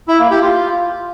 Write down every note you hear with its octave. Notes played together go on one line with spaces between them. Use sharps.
E4
A#3
G4
F4